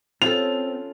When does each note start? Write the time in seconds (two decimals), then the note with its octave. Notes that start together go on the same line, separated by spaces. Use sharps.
0.22 C#3 C4 F4 A4 F7